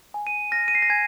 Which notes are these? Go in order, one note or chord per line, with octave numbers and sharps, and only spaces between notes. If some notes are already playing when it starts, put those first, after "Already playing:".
G#5
D#7
F6 A#6
D#7
C7
A#6
G#5 G#6